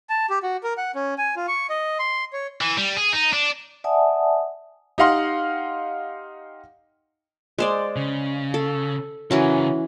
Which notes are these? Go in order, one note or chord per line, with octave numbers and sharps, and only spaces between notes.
A5
G4
F#4
A#4
F#5
C#4
G#5
F4
C#6
D#5
C6
C#5
E3
G3
G#4
D#4
D4
D5 E5 F#5 G#5 A5 D#6
D#4 G4 D#5 F5 F#5 C6
G#3 C5 D5
C#3
A4
C#3 E3 C#4 F#4 A#4